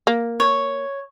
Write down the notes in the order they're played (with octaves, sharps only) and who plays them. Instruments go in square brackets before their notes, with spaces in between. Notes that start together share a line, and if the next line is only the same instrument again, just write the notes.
[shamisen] A#3
[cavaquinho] C#5